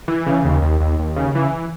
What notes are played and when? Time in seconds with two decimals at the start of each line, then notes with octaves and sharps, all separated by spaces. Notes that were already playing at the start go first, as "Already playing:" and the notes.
0.08 E3
0.27 C#3
0.45 D#2
0.62 D#2
0.80 D#2
0.99 D#2
1.16 C#3
1.35 E3